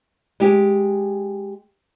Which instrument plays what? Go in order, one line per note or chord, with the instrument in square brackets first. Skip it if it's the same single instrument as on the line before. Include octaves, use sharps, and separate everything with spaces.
[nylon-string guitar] G#3 G4